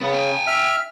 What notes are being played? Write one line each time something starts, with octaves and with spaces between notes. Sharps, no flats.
C#3 B3
G5 G#5
E5 F6